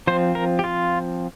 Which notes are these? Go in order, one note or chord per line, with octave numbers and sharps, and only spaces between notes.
F3 C4 C5
A#4
G4
F4